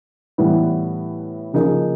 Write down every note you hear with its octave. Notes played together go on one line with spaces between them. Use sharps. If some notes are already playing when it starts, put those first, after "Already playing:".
A2 E3 G3 B3
C#3 F3 A#3 D#4 G#4